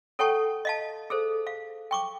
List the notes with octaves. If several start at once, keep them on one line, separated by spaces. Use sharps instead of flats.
A4 C#5 F#5 G5 A5 C#6
D#5 F5 A5
G#4 A4 C5
F5
G5 C#6 D6